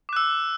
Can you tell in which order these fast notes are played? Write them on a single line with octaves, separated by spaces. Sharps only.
D6 F#6 E6